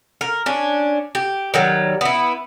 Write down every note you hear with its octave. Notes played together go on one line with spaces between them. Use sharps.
A#4
C#4 D4
G4
D#3 F#3 G3
B3 E4